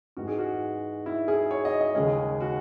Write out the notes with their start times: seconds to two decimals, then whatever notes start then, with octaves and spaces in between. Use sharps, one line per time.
0.17 G#2 E3 G#3 F#4
0.27 G#4
0.38 F#4
1.06 E4
1.28 G#4
1.51 C#5
1.65 D#5
1.81 D#5
1.95 D#2 C#3 G#3 G#4
2.41 F#4